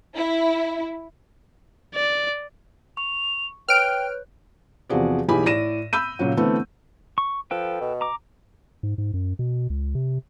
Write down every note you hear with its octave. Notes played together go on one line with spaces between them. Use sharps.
E4
D5
C#6 F7
B4 C#5 G5 F6 F#6 D7
E2 C3 F3 F#4 G#4 D5
B1 E3 G4 G#4 G#5 B5
A2 D5 A#6 D#7 E7
B5 E6 G6 D#7
A#2 C#3 F#3 F#4
D3 E3 A3 B3 C4
C#6
F3 A4 B4 G5
B2
A#5 D6
G#2
G#2
F#2
B2
C#2
C3